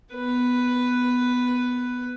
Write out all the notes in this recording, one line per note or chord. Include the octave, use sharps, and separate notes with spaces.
B3 B4